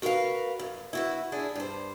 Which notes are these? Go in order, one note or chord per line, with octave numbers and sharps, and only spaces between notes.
F#4 A#4 B4 D#5 F5
F#2
E4 F#4 B4
D4 E4 G#4
G2 C5